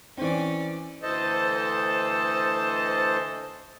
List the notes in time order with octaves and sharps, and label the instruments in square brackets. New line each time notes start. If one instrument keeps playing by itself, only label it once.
[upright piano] E3 C4 [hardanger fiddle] C#4 D5
[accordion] D2 E3 A4 C5 D#5 A5